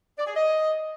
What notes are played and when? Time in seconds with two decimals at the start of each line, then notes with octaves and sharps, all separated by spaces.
0.18 D5
0.26 G#4
0.35 D#5